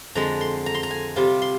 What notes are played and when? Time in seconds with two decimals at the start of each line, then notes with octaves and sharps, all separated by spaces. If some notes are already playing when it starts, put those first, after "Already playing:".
0.15 F2 D3 G#3 A#5
0.41 C6
0.66 A#5
0.74 C6
0.83 A#5
0.91 G#5
1.16 C3 G3 C4 F4
1.42 C6